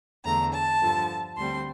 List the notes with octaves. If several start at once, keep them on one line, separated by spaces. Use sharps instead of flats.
E2 D3 A3 D4 A#5
A5
G2 D3 F3
D2 D3 G3 C4 C6